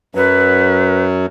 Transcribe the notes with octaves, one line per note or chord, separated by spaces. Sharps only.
F#2 F#3 B4